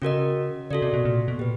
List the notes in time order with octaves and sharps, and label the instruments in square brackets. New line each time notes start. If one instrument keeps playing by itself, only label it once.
[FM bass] C#3 [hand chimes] C#4 F#4 A#4 D#5
[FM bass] C#3 [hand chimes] F#4 A4 D5
[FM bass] C3
B2
A#2
B2
[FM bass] A#2 [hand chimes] G4 B4